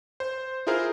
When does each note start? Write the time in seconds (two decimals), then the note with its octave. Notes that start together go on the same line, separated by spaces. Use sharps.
0.20 C5
0.67 E4 F4 G#4 A#4 C5 F5